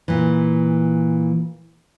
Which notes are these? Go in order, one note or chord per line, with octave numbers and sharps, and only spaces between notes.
A#2 E3